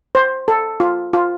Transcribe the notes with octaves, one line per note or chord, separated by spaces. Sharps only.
C5
A4
F4
F4